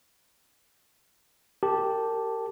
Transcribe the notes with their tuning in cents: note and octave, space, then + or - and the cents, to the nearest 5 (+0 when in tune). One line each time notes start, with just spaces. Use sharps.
G4 +0 A#4 -30 A5 +0